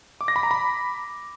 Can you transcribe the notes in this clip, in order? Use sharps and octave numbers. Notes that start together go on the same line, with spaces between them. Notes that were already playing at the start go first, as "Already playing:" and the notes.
D6
A#6
B5
A#5
B5